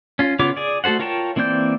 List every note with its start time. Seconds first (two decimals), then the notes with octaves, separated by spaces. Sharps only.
0.19 C#4 F4
0.39 C#3 B3 F4 C#5 D6
0.57 G#4 D5
0.84 A3 F#4 A4 C5 F#5
0.99 F4 A#4 C#5 G5 A5
1.36 E3 A#3 C4 D5 G6